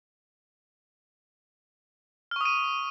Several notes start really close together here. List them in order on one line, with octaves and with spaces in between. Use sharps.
F6 C#6 D#6 D#7